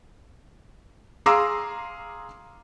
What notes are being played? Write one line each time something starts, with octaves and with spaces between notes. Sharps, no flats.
G#4 F5 A#5 C6 D6 E6